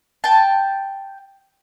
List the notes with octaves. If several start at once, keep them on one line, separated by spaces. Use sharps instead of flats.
G5 A5